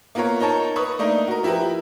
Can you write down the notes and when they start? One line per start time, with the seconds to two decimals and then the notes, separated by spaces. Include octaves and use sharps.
0.15 A#3 B3 F4 A#4 C#5
0.40 D#4 A#4 C#5 A5
0.76 B4 C#6 D#6
0.99 A3 A#3 D4 D#4
1.28 F#4 A#4
1.43 F3 E4 G4 A#4 B4